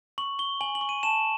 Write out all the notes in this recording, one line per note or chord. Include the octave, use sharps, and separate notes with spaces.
C#6 F#7
C#6 G7
G#5 F#7
F#7
C#6
D#7
A5 E7